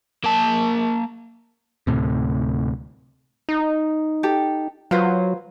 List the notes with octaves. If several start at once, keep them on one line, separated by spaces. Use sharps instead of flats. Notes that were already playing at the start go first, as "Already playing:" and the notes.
A#3 A5
D2 A2 C3
D#4
G4 A4
F#3 F4 B4 C5